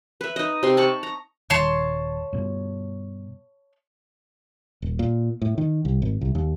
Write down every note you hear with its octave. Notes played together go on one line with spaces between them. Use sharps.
B4 E5
D#4 D#5
C3 C6
A5 B5 C#6
A#5
D#1 D#3 C#5 A5 C6
G2 B2
D#1
A#2
A2
D#3
C2
G#1
C2
D#2